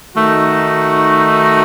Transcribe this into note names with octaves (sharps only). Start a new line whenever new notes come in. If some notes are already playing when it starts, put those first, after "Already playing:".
D#3 A3 D#4 F#4